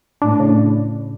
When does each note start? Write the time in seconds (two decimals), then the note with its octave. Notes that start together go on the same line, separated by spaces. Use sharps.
0.22 A2 D4
0.40 C#3